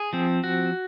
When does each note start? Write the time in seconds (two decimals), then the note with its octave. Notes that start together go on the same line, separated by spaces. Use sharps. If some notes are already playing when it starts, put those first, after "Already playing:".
Already playing: G#4
0.13 F3 C4
0.44 F#4